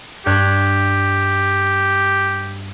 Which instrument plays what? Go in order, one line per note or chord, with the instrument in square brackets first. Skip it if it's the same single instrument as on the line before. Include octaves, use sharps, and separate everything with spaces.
[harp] G2 F#6 G#6 [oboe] G4